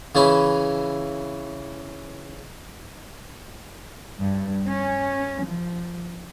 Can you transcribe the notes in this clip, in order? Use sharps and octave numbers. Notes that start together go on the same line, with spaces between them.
C#3 E3 C#4 B5
G2
C#4
F3